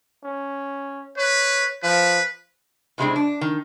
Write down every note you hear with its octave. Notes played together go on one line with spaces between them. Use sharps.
C#4
B4 C#5
F3 B4
A2 C3 G3 G#3 C4 D4
D4
D#3